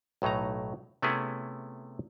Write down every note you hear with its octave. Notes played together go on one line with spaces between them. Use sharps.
B1 A2 F#3 D#4 A#5
C3 A3 B3 C#4 E4 G#4